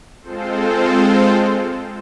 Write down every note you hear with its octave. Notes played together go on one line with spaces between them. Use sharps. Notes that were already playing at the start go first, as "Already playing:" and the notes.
G#3 C4 F4 A4 C5